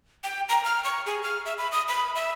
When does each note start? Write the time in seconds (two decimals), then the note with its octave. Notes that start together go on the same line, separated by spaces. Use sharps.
0.24 G5
0.49 A#5
0.65 F6
0.84 C#6
1.06 G#4
1.23 F6
1.46 E5
1.58 B5
1.72 D#6
1.88 B5
2.15 E5